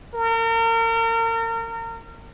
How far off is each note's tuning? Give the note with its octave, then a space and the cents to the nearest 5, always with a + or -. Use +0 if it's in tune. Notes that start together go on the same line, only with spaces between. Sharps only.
A#4 -35